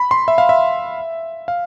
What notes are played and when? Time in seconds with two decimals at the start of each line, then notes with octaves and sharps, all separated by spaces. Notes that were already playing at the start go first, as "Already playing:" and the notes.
Already playing: B5
0.11 C6
0.28 E5
0.38 F5
0.49 E5
1.48 F5